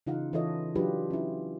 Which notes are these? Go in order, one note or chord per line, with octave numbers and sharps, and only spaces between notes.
C#3 E3 D#4 F4 F5 F#5
E3 E4 F4 A4 C#5 D#5
F#3 D4 F4 G4 B4
C#4 E4